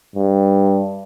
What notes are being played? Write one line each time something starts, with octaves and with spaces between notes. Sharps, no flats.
G2